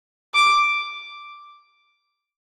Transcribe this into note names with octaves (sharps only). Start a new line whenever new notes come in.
D6